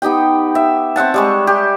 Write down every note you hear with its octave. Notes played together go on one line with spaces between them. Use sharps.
B3 D#4 G4 G5
E5
C4 E5 F#5 A5
G3 G#3 C#6
G4